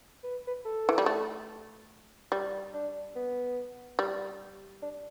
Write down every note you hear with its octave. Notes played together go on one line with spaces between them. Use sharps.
B4
B4
A4
E3
G3
A3
G3
D4
B3
G3
D4